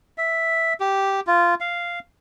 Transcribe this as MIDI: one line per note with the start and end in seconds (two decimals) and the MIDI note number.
0.18 0.73 76
0.80 1.20 67
1.27 1.55 65
1.60 1.99 77